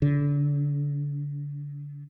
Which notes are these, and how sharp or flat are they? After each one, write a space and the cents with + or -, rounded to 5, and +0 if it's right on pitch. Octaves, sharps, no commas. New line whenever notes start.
D3 -30